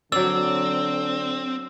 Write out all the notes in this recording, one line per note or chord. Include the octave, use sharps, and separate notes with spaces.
D3 F#3 C4 D5 E6